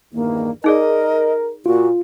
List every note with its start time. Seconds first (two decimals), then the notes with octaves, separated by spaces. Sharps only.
0.14 E2 G2 D#3 A#3
0.64 D#4 G#4 A#4 D5 D#5
1.66 A#2 F4 F#4